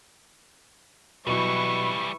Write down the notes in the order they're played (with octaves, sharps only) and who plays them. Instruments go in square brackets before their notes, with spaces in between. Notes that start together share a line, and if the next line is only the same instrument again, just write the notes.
[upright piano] B2 F#3 [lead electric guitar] E3 G3 [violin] E4 B4 [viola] C#6